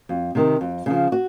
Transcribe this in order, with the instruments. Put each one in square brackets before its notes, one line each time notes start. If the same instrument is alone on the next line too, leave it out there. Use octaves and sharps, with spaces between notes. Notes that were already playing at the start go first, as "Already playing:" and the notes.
[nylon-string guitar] F2
C3 D#3
F2
C#3 F3
F#4